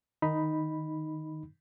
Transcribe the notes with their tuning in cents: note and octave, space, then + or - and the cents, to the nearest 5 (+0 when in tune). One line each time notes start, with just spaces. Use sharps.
D#3 -10 D#4 +0 B5 +0